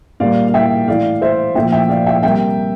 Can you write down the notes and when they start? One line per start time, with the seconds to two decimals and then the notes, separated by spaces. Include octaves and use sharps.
0.20 A#2 G3 A#3 D5 F5
0.48 F5
0.54 E5 G5
0.88 A2 E3 A3 D5 F5
1.22 C5 E5
1.55 A#2 F3 A3 E5 G5
1.72 E5 G5
1.89 D5 F5
2.06 E5 G5
2.23 C3 G3 A#3 E5 G5